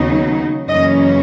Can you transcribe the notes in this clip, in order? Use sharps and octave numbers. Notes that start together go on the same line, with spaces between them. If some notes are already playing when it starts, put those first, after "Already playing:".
Already playing: D#2 C#3 F#3 B3 D#4
F#2 C#3 E3 A#3 C#4 D#5